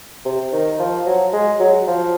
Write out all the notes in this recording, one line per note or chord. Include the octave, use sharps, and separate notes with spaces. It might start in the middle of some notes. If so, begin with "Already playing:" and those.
C3
D#3
F3
F#3
G#3
F#3
F3